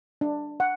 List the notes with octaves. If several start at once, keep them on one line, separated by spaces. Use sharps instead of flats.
D4
F#5